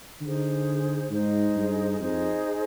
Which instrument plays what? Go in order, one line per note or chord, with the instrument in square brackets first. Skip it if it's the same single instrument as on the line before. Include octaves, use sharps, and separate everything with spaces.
[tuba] D3 [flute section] D#4 G#4 C5
[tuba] G#2 [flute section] D#4 G#4 C5
[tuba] G2
[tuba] F2 [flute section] D#4 G#4 C5